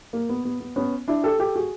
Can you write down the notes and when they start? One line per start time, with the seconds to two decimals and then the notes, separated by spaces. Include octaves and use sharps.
0.13 A#3
0.29 B3
0.45 B3
0.60 B3
0.76 B3 C#4
1.08 D4 E4
1.24 G4 A4
1.39 G4 A4
1.55 F#4 G#4